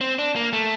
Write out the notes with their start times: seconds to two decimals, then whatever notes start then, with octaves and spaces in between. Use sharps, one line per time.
0.01 C4
0.19 D4
0.36 A#3
0.53 A3